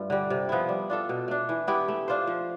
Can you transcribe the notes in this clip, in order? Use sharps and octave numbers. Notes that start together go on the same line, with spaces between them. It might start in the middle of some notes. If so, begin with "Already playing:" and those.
Already playing: G2 A3 F4
D3 G3
C3
F3 B3 E4
G3
D4 F4 A4
B2
A3 D4
E3
B3 E4 G4
A3
D4 F4 C5
F3